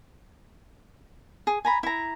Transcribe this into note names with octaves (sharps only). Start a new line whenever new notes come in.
G#4
G#5 A#5 B5
E4 A#5